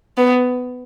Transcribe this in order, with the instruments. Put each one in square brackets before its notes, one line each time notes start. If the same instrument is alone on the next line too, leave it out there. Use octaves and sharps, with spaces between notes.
[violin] B3